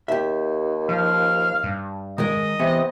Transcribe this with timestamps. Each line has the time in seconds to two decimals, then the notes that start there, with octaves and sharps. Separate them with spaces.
0.08 D#2 G4 E5
0.89 F3 F5
1.64 G2
2.18 D#3 G#3 A#4 D#5
2.59 C3 E3 B3